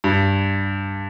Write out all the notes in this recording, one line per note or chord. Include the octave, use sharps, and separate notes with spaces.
G2